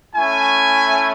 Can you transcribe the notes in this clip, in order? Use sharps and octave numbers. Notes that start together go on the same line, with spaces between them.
A3 C#4 E4 G#5